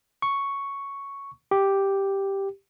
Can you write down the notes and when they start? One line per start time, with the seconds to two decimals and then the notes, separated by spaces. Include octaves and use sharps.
0.22 C#6
1.51 G4